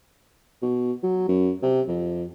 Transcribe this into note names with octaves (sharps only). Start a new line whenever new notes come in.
B2
F#3
F#2
C3
F2